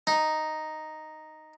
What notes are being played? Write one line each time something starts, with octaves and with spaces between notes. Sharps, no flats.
D#4